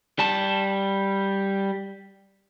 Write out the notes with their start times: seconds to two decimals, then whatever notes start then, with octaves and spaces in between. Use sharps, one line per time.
0.19 G3 A5